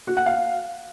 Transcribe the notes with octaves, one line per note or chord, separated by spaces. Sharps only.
F#4
F#5
F5